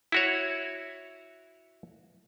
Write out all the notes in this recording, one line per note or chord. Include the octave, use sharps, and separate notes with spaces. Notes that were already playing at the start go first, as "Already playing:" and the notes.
E4 F#4 C#5